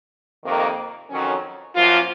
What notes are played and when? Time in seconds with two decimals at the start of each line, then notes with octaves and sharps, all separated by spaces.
0.44 F2 C3 D#3 A#3
1.09 F2 D#3 F#3 C#4
1.75 F#2 F3 A#3 F4